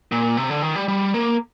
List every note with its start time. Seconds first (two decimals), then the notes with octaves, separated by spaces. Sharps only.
0.12 A#2
0.37 C3
0.50 D3
0.62 D#3
0.76 G3
0.88 G3
1.14 A#3